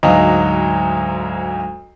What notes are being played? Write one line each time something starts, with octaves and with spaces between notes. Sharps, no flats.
D2 G#2 F#3 D#5 F5